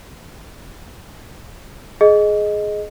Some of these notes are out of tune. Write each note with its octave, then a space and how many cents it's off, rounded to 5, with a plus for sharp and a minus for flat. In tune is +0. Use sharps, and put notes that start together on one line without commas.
G#4 +15 D#5 +0